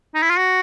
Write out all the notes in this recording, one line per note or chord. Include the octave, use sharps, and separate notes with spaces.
D#4
E4
F4
F#4